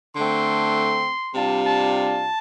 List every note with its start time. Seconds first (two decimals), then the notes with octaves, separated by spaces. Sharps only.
0.15 D3 A3 C4 C6
1.34 C3 G3 D4 F4 A5
1.64 A5
1.94 A5